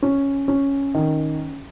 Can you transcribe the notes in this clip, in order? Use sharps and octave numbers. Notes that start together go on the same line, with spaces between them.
C#4
C#4
D#3